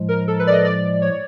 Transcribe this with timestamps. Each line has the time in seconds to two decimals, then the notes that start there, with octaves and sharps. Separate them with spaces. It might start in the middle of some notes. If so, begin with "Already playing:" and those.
Already playing: A2 F3 G#3
0.09 A#4
0.28 A4
0.39 B4
0.47 D5
0.52 D#5
0.65 D5
1.02 C#5